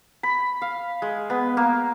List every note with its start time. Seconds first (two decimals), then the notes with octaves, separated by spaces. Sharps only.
0.23 B5
0.62 F5
1.02 G#3
1.30 B3
1.57 A#3